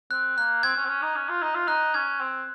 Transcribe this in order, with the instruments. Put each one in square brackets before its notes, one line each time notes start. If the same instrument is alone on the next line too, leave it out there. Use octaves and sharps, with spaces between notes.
[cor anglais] C4 [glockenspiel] F#6
[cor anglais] A#3 [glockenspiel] F#6
[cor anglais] C4 [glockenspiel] G#6
[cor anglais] C#4
C4
C#4
D#4
C#4
F4
D#4
F4
[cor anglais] D#4 [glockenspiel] F#6
[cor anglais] C#4 [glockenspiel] G#6
[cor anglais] C4